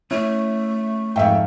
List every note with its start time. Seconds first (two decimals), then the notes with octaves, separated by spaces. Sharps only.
0.11 A3 C#4 E4
1.16 F2 G#2 E5 G5